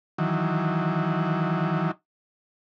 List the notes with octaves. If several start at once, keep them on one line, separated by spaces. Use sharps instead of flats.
D#3 E3 F#3